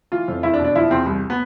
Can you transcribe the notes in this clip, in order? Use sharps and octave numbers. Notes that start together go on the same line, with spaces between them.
E3 F4
F2
E2 E4
D4
B2
D4
F3 E4
E2 C4
C2
B3